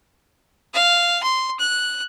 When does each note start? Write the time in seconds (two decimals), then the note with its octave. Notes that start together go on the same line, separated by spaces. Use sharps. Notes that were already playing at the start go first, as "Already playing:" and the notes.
0.74 F5
1.23 C6
1.60 F#6